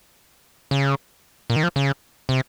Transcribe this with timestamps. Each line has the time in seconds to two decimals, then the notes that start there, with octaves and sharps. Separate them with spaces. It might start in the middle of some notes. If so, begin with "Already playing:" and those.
0.71 C#3
1.50 A#2
1.56 D#3
1.63 F3
1.76 C#3
2.29 C3